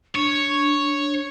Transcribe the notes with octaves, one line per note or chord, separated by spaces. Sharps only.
D4 C#5